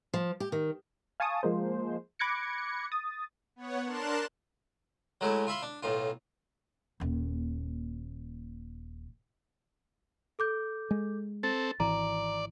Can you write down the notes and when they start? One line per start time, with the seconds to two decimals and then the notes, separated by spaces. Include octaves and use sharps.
0.14 F3
0.40 G4
0.52 D#3
1.20 F5 G#5 A5 C#6 D#6
1.43 F3 G#3 A#3 C5
2.19 B5 D6 F#6 G#6 A#6 C#7
2.92 D#6 A6
3.56 B3 C#5 F#5
3.85 D4 A#4 A5 C6 F#6 E7
5.21 F#3 G#3 A3 E4
5.47 F4 E5 B5 C6
5.62 D4
5.83 B1 A2 F4
7.00 D#1 D#2
10.39 A4 D6 G6
10.91 G#3
11.43 C4 A4 A6
11.80 G#1 E3 D5 A#5